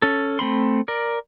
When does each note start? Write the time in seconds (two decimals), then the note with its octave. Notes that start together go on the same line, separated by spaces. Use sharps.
0.02 C#4 A4
0.39 A3 C4 B5 C6
0.88 A#4 D5